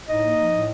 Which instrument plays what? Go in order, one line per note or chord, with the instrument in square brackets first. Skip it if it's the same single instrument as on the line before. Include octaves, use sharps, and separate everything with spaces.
[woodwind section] A2 D#4 D#5
A#3
F3
A2